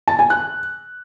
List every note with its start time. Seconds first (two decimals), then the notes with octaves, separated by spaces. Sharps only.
0.08 A5
0.19 G#5
0.30 F#6